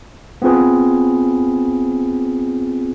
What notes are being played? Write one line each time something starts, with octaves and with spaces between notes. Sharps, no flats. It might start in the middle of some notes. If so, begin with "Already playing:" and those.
B3 C4 F4 G#4 B4